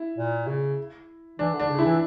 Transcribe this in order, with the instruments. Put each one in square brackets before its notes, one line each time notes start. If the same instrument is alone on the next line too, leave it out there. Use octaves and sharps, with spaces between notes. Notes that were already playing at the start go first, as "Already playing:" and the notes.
Already playing: [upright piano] E4
[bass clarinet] A#2
C#3
[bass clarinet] E3 [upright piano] D4
[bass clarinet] D3
[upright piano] D4
[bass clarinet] C#3
[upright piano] E4
[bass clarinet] E3